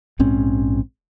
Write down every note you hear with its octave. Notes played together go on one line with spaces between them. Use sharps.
A#1 G#2 C4 C#4